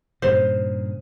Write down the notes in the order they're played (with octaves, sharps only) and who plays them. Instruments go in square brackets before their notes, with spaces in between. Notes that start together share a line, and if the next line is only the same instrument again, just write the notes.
[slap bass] G2 A#2 C#3 [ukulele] C5